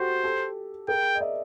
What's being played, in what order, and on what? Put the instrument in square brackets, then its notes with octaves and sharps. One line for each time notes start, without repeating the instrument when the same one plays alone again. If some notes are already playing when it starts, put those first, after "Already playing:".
Already playing: [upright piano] F#4 G4 A4 [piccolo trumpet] C5
[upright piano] G4 A4
[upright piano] G#4 A#4 [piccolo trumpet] G5
[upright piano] D#5
D5 E5